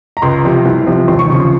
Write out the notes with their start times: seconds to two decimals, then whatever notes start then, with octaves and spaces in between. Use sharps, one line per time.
0.17 A#5
0.22 C#2 C6
0.44 C3 F3
0.65 C2
0.86 C3 F3
1.08 D#2 C6
1.19 C#6
1.30 C#3 C#6
1.33 F3
1.40 C6